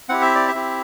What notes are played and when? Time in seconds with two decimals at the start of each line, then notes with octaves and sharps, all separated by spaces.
0.09 C4 E4 G4 F#5
0.22 E5
0.35 D5
0.48 E5
0.55 C4 E4 G4